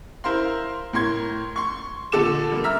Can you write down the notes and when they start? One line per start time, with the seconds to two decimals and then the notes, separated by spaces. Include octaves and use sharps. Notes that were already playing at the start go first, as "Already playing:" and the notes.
0.24 E4 A#4 C5 F5 C6
0.93 A2 A#4 C6 G#6
1.56 C6 C#6
2.12 A#2 D3 A4 D6 E7
2.52 G3 A#3
2.64 E5 A#5 E6 F6